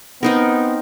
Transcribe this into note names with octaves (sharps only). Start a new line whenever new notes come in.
B3 C4 D#4 A#4